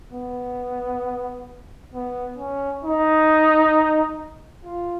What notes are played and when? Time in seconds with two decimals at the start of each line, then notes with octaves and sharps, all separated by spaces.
0.12 B3
1.94 B3
2.38 C#4
2.84 D#4
4.65 F4